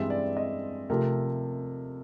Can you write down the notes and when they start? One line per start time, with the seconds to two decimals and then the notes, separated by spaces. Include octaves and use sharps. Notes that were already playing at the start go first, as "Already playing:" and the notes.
Already playing: G2 E3 G#3 C4 E5
0.10 D5
0.37 D#5
0.90 C3 F3 A3 A#4